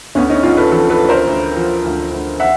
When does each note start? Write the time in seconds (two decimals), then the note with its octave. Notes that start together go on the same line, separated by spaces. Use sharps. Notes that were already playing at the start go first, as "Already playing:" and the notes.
0.15 D2 B3 C#4
0.30 C#4 D#4
0.43 D2 D#4 F4
0.57 A4 B4
0.71 F3 A4 B4
0.90 A4 B4
0.99 D2
1.09 A#4 C5
1.27 D2
1.56 F3
1.84 D2
2.11 D2
2.40 E5 F#5